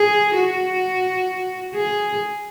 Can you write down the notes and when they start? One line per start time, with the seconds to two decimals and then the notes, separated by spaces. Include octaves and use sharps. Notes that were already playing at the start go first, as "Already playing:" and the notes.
Already playing: G#4
0.36 F#4
1.75 G#4